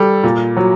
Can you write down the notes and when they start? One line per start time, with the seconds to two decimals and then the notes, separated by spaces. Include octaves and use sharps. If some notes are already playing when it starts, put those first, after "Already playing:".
Already playing: G3 A4
0.24 A#2
0.57 F#3